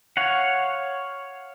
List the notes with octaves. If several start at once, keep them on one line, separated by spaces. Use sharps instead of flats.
C#5 F5 F#5